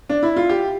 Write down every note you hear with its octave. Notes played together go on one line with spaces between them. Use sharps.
D4
E4
F4
G4